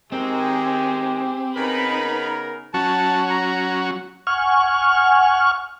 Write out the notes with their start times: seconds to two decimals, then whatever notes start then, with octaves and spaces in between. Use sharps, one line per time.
0.12 D#3 G#3 C4 G4 G#4
1.56 C#3 B3 D#4 A#4 B4 B5
2.74 F#3 C#4 F#4 A5
3.30 A#5
4.27 F#5 G#5 C#6 F6